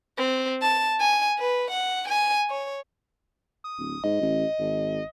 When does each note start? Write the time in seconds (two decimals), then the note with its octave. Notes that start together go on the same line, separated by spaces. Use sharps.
0.18 C4
0.62 A5
1.00 G#5
1.39 B4
1.71 F#5
2.08 G#5
2.50 C#5
3.64 D#6
3.78 D1
4.04 G#2 D#5
4.21 A1
4.59 G#1